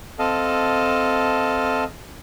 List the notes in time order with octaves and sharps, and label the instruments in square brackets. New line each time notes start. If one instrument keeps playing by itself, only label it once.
[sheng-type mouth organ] C4 A4 D#5 F5 A5